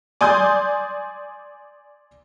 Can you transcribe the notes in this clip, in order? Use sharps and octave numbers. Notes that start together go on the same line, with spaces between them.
D5 G#5 C6 D#6 G6